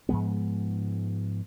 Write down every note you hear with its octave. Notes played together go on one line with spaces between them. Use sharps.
G#2 F3 G#3 B3